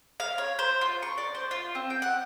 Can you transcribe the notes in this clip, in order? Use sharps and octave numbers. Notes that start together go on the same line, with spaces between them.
F5
C#5
C5
F4
C#6
D5
C5
F4
C4
G5
F#5